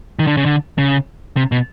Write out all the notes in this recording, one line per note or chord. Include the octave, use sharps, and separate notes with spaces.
D#3
D3
C#3
D3
C#3
C3
B2